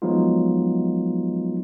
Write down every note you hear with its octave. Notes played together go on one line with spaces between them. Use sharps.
F3 F#3 G#3 B3 D#4 F4